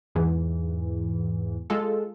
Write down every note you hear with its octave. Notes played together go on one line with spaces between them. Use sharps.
E2 G#2 E3
G#3 F4 A4